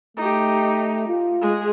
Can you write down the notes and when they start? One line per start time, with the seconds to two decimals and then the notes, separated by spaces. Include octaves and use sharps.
0.17 A3 D#4 G4
1.08 F4
1.41 G#3 G#4